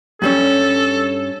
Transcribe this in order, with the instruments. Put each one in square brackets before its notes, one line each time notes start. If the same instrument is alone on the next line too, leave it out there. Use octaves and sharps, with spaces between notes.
[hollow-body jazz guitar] G2 G3 C#4 [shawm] A4